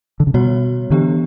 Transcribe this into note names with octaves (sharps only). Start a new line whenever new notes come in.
D3
C#3
B2 G3 B3 F#4 C#5
D3 E3 B3 D4 G4